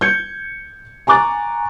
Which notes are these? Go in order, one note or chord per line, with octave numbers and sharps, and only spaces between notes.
G6 G#6 C#7
G#5 A#5 C#6 D6 F#6 A6